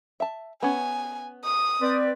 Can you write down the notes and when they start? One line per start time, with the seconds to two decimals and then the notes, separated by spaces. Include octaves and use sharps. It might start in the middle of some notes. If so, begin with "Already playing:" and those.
0.20 E5 A5
0.63 B3 C#4 G#5
1.44 D#6
1.82 C4 B4 D5